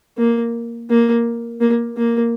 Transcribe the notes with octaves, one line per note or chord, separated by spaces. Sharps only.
A#3
A#3
A#3
A#3